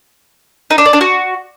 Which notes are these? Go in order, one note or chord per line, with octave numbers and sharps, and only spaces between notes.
D#4
D4
D5
D4
F#4